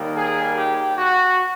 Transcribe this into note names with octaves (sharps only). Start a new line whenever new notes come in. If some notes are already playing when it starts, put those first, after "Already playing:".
Already playing: D#2 D#3 G3 A#3
G#4
G4
F#4